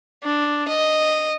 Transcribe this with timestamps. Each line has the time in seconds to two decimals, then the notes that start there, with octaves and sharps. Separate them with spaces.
0.24 D4
0.67 D#5